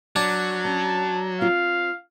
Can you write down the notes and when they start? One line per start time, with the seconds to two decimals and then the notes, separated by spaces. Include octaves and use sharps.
0.16 F#3 D4
0.65 C#4 A5
1.41 C4 F4 F5